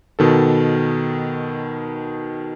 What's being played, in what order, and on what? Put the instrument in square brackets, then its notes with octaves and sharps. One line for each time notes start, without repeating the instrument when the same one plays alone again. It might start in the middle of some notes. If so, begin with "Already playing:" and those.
[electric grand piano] B2 D#3 A4